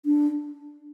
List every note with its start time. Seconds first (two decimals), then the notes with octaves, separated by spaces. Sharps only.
0.06 D4